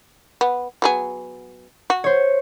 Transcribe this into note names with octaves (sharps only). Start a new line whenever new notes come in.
B3
F#3 B3 G#4
F#4
C5 C#5